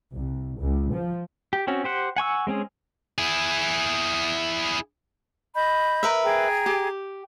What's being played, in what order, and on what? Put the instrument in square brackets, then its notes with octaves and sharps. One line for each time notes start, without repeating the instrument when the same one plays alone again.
[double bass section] C2
C#2
F3
[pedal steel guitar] G4
C4 C#4 F#4
G4 C5 F#5
F#5 G#5 C#6 E6
G#3 C4 C#4 G#4
[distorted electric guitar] E4 G#4
[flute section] D#5 B5 G6
[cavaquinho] A#4 B4 E5
[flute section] G#4 G5 A#5
[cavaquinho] G4